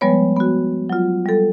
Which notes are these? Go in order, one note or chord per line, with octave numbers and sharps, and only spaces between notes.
F3 G3 G#3 B3 B4 C#5
B3 F#4
F#3 F4
G3 A4